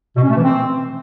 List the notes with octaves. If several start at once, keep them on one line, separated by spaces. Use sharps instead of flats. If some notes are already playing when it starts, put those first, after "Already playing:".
B2
C#4
A3
E3
C4